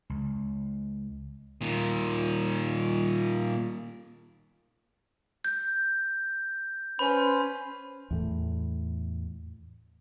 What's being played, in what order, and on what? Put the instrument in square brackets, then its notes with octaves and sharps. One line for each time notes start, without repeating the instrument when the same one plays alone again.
[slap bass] C#2
[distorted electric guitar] A#2 D#3
[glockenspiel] G6
[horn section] C#4 B4 C5 [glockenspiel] B5
[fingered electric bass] E2 A2